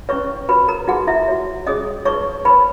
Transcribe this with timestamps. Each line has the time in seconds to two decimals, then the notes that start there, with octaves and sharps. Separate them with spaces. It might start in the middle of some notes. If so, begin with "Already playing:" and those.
0.09 C#4 E4 B4 C#5 C#6
0.49 F#4 A#4 B4 C#5 B5
0.68 A#4 A#5
0.87 D#4 F#4 G#4 B4 F#5
1.07 E4 E5
1.28 F#4 C#5
1.66 C#4 G#4 C#5 D#5 D#6
2.05 D#4 G#4 B4 C#5 C#6
2.45 D#4 A#4 B4 C#5 B5